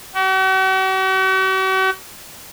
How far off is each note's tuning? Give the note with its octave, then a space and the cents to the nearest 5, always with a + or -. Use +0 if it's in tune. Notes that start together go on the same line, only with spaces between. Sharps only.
F#4 +45